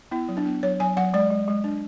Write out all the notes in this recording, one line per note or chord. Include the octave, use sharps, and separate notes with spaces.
B3 E4
F#3
D4
B3
F#3 C#5
F#3 G#5
F#3 F#5
G#3 D5
G#3
G#3
D4